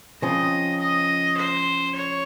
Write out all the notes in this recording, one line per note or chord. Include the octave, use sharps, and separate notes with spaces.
C#3 F3 C4 D#5
D#5
C5
C#5